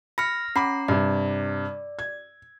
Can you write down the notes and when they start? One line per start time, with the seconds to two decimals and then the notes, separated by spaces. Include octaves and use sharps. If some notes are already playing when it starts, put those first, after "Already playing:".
0.18 B5 F6 A#6 C#7
0.56 C#4 F#5 A#5 B5 D6 C7
0.88 G2 C3 D5
1.99 G#6